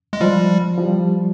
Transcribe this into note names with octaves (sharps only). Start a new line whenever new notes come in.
G#3
F3 G3
F3
G3